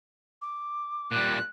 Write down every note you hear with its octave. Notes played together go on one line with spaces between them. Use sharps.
D6
A#2 G3 F#6